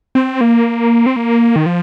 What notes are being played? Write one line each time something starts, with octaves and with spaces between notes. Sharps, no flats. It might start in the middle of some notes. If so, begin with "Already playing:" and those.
C4
A#3
C4
A#3
D#3
F3